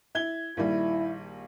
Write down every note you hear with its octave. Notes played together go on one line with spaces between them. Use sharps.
E4 G#6 G7
A#1 D#3 G3 E4